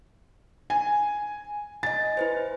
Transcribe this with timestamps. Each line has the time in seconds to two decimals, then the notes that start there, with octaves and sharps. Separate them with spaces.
0.70 G#5
1.83 D#5 G#5 A6
2.17 E4 B4 C5